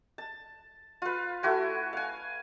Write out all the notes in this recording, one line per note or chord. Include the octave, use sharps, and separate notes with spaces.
A5
F4 B4
A3 E4 F#4 G#5
F5 G#5